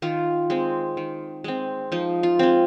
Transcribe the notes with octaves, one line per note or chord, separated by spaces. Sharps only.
D#3 F4
G#3 C4
D#3
G#3 C4
F3 D#4
F4
G#3 C4